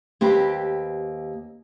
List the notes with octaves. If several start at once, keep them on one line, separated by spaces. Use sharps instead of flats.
D#2 C4 G4 B4